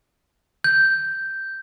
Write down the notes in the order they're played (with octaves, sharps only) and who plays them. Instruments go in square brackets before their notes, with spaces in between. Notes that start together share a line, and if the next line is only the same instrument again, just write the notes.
[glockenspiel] G6